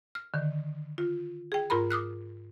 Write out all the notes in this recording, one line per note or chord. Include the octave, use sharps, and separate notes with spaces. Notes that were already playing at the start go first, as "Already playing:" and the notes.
F6
D3 D#3
F4
G#4 G5
G#2 F4 A#4 A#5 B5
D6 D#6 F6 F#6